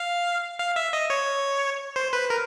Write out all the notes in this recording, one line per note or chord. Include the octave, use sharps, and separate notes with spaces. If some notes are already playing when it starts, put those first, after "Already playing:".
Already playing: F5
F5
E5
D#5
C#5
C5
B4
A#4